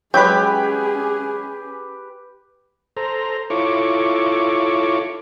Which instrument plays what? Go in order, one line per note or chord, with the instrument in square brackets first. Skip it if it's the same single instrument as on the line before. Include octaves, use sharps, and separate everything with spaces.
[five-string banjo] F#3 G#3 [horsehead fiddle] C#4 G#4 [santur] G4 B4 [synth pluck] G5 B5
[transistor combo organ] A4 C5 A#5
E4 F4 A4 C#5 C#6 D6